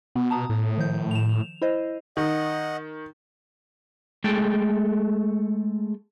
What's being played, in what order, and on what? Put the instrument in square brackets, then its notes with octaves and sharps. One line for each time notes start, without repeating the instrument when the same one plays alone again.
[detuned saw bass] B2 [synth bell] B3
[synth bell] A5 A#5 D#6
[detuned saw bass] A2
[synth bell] D#3 F3 G6
E7 F7
E4 C5 D#5
[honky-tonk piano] D#3 [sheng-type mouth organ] D#5 F#5
[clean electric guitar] G#3 A3 A4 G5